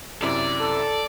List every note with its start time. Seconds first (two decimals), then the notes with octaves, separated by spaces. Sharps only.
0.22 F#2 C3 E4 D5
0.60 A4